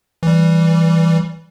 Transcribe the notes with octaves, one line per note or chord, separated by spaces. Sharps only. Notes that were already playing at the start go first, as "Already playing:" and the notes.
E3 G3